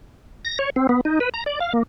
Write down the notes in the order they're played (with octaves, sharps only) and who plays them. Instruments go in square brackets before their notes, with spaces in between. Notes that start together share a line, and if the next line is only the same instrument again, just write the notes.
[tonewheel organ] A#6
C#5
C4
B3
D#4
B4
A#5
D5
F5
A#3